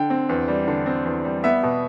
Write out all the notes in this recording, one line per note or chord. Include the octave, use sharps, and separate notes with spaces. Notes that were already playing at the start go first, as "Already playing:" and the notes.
Already playing: D3 G5
C4
E2
G3
D3
C4
E2
G3
B3 E5
B2